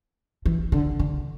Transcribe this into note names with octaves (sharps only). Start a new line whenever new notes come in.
E3
D3
D3